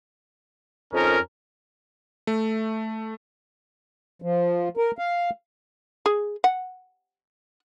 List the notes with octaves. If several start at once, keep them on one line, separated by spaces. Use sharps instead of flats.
F2 C#4 D#4 A#4
A3
F3
A#4
F5
G#4
F#5